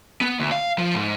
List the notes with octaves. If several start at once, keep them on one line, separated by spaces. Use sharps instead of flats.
B3
D2
F5
F3
G#2